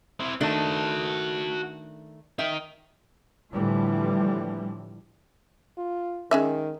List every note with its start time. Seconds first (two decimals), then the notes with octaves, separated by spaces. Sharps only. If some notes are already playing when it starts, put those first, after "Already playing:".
0.20 C4 E4
0.41 D#3 A3 D4 F#4 A5
2.39 D#4 E5 G5
3.52 A2 D3 E3 F3 G3
5.78 F4
6.31 D#3 G#3 C#4 E5